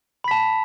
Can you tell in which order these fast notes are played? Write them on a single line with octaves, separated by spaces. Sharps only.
B5 B6 A5